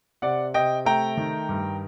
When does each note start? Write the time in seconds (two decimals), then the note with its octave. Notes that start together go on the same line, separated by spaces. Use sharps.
0.22 C3 D5 F#5
0.54 C3 D#5 G5
0.85 A3 G5 A#5
1.17 D#3
1.49 G2